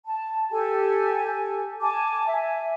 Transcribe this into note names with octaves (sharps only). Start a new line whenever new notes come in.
A5
G4 A4 G#5
G#5 A5 D6
E5 G#5